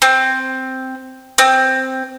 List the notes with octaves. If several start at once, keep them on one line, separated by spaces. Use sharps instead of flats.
C4
C4